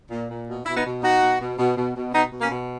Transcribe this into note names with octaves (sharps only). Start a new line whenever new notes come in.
A#2
A#2
B2
B2 E4
B3 D#4
B2
B2 D#4 F#4
B2
B2
B2
B2
B2
B2 B3 D#4
B2
A#3 C#4
B2